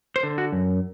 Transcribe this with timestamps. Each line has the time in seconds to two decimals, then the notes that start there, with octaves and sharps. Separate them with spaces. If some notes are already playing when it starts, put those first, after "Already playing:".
0.16 C5
0.23 D3
0.38 F#4
0.52 F#2